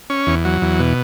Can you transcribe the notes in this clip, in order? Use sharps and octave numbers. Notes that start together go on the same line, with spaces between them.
C#4
E2
F#3
E2
B2